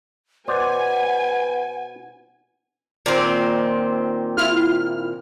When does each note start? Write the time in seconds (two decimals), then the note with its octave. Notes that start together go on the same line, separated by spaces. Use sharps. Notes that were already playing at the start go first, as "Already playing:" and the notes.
0.48 B2 B4 C5 D5 F#5 G#5
3.06 A#2 D#3 C4
4.37 E4 F4 F6